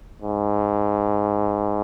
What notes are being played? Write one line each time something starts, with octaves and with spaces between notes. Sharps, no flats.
G#2